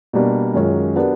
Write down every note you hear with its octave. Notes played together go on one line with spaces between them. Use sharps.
B2 G3 A#3 D4
F#2 D#3 G#3 C#4 F4
F#3 B3 D4 G4 A#4